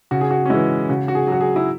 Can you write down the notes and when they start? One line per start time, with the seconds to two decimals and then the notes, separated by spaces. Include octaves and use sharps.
0.11 C#3 F#4
0.21 G#4
0.31 F#4
0.46 C#4
0.50 E3 G#3 E4
0.89 C#3 F#4
1.08 F#4
1.15 G#4
1.27 F#3 F#4
1.41 G#4
1.56 E4